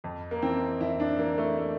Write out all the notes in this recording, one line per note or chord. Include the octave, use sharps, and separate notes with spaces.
F2
A#3
E3 C4
F2 E4
D4
E3 A#3
A3
A3